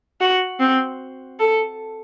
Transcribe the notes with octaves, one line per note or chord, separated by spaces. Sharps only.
F#4
C4
A4